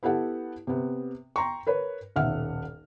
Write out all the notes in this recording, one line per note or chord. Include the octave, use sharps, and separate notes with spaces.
B3 E4 G4 A4 F#5 A5
C3 B3
G5 A#5 C6 C#6
A#4 B4 C#5
D#1 B1 E5 F#5 F6